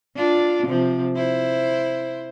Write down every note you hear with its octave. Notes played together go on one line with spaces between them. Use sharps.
D4 F4
C3 F3
E4 C5